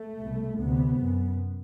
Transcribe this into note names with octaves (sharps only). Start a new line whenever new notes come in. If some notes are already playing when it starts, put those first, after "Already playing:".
Already playing: A3
C2 B2
D2 C3 B3
F#2